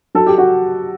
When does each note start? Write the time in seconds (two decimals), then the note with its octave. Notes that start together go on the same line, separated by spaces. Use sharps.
0.15 F#3 A4
0.26 G4
0.38 F#4